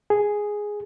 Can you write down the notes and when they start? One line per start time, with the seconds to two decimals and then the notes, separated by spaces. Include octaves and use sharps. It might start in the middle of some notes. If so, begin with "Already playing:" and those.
0.10 G#4